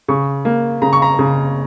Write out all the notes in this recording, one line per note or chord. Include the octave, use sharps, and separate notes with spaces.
C#3 C#6
A#3
C#3 A#5
C#6
A#5
C#3